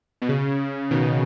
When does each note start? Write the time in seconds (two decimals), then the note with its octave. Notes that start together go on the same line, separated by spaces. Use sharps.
0.22 B2
0.29 C#3
0.91 B2 D#3